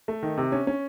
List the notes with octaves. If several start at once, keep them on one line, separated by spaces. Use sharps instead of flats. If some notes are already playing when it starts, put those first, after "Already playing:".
A3
D#3
C3
C#4
C#4